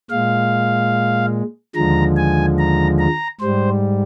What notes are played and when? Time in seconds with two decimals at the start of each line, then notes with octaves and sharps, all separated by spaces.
0.10 A#2 G#3 F5
1.75 D#2 D3 F3 G#3 A#5
2.17 G#5
2.58 A#5
2.99 A#5
3.41 G#2 G3 C5